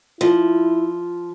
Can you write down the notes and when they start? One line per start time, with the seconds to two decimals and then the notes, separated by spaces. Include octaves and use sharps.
0.21 F3 E4